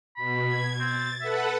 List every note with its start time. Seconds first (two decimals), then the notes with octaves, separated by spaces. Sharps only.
0.17 B2 B5
0.47 G#6
0.80 C4 A6
1.21 A4 B4 E5 F#5